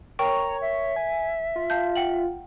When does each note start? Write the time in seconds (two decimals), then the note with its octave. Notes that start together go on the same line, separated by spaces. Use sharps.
0.19 A#4 C#5 G5 A#5 C#6
0.61 E5
0.96 G#5
1.56 F4
1.70 F5 A5 G6
1.96 F#5 G5 F#7